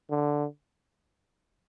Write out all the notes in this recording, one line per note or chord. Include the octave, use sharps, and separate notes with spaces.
D3